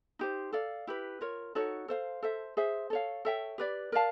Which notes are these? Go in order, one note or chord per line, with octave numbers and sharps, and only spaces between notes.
D#4 G4 C5
A4 D5 F5
E4 G4 B4
F4 A#4 C#5
D#4 F#4 A4 C#5
A4 C5 F5
A4 C5 E5
G#4 C5 E5
A4 C#5 F5
A4 C#5 E5 G5
G4 B4 D5
A#4 D5 F5 A5